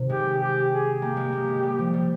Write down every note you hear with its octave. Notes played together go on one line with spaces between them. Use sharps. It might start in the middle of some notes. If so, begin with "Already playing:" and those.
Already playing: C3 D#3
G#3 G4
G4
G#4
A#3 G4
G#3
A#3
G#3
G3
F3
G3